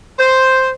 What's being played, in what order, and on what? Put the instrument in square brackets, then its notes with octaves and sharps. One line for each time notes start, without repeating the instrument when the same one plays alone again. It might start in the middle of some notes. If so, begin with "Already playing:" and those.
[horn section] C5